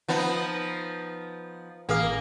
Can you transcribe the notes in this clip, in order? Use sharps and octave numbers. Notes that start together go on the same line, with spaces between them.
F3 B3 D#4
A1 A#3 G#4 F5